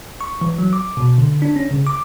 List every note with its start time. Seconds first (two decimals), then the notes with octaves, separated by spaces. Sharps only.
0.21 C#6
0.41 E3
0.58 F#3
0.73 D6
0.97 B2
1.18 D3
1.42 D4
1.56 C#4
1.71 C#3
1.87 D6